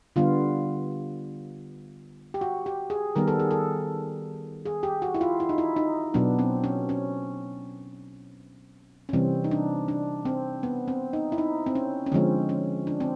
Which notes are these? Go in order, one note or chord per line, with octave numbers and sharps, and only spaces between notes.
D3 G3 B3 F4
G4
F#4
G4
G#4
D#3 G3 B3 A#4
A4
G#4
A4
G#4
G4
F#4
E4
F4
E4
D#4
E4
D#4
B2 F#3 B3 D4
C4
C#4
C#4
C#4
C3 E3 G3 C4
D#4
D4
D4
C4
B3
C4
D#4
E4
D#4
C4
C#4
C#4
D3 F3 G#3 C4
C#4
D4
C4